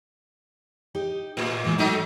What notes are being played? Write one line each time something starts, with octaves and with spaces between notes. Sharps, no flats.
D#4 G4 D#5
A2 G#4
G#2 E3
F#3 A3 D#4